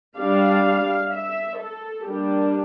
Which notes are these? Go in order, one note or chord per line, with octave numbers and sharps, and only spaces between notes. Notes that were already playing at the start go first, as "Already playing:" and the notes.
G3 D4 F5
E5
A4
G3 A#3 D4 G4